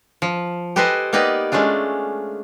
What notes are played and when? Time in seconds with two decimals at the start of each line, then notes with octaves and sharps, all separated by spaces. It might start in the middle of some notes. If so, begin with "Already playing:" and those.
0.22 F3
0.76 G4 A4 B4 C5 D#5 G#5
1.13 A#3 B3 D#4 G4 B4 D5
1.52 G#3 A3 C#4 D4 F4